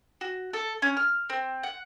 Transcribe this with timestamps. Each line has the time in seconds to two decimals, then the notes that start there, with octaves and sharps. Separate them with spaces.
0.21 F#4
0.53 A4
0.82 C#4
0.97 F6
1.30 C4
1.63 F#5